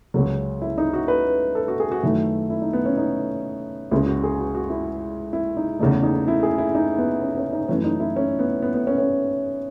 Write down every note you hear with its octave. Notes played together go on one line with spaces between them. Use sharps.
C#2 C#3 F#3 C#4
E4
D#4
F#4
B4
A4
F#4
G#4
F#4
F#2 D#3 A3 E4
E4
D#4
B3
C#4
D#4
C#2 C#3 G#3 E4
F#4
G#4
F#4
F#4
E4
E4
D#4
E2 C#3 E3 A3 D#4
D#4
E4
G#4
E4
D#4
B3
C#4
C#4
D#4
F#2 E3 A3 C#4
D#4
E4
C#4
B3
B3
B3
C#4
C#4